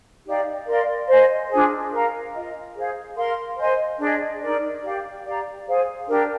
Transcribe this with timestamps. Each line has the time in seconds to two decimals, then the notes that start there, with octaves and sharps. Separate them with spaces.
0.26 D#4 G4 D5 F5
0.67 A#4 D5 F5 C6
1.08 C5 D#5 G#5
1.50 D4 F4 G#4 C5
1.91 A#4 F5 A#5
2.34 F4 A#4 D#5
2.75 G#4 C5 F5
3.17 A#4 F5 C6
3.58 C5 D#5 G#5 C6
3.99 D4 G#4 D#5
4.41 D#4 A#4 D5
4.84 G4 D5 F5
5.25 G4 D5 F5 A#5
5.67 G#4 C5 F5
6.08 D4 G4 A#4 D5